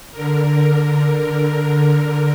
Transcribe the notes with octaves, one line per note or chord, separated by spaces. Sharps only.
D3 A#4